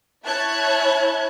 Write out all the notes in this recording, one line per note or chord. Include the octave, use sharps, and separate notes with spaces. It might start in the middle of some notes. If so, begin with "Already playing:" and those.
E4 C#5 E5 A5 F#6 G#6